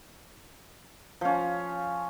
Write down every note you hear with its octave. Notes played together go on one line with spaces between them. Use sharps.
F3 C#4